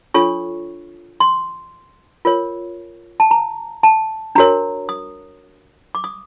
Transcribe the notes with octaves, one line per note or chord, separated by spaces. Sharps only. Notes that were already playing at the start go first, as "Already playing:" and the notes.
D4 F4 A4 C#5 C#6
C6
F4 A#4 C#5
A5
A#5
A5
D4 F#4 A#4 C#5 A#5
D#6
D6
D#6